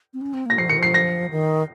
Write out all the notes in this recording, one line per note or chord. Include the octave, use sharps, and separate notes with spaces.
C4
C#4
C4
A#3 A#6
F3 C7
D#3 C#7
F3 C7
A#6
D#3